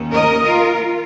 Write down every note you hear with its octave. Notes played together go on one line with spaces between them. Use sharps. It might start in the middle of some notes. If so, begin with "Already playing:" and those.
Already playing: D#2 D#3 C#4
A#4 D#5
F4 A#4
F4